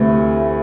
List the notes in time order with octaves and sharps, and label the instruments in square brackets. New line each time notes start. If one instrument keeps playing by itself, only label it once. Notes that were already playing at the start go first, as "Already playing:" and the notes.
Already playing: [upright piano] D2 C3 E3 A3 E4